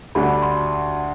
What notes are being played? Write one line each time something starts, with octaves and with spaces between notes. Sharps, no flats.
D2 D3 G3 D4 F#4 B5
C6